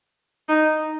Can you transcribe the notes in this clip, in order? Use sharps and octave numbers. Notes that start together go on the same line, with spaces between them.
D#4